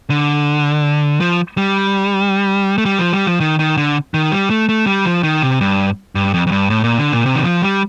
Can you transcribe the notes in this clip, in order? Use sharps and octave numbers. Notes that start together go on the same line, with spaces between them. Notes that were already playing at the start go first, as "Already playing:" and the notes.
D3
F3
G3
A3
G3
F3
G3
F3
D#3
D#3
D3
D#3
G3
A3
A3
G3
F3
D#3
C3
G2
G2
F2
F2
G2
A2
A#2
D3
A#2
C3
D#3
F3
G3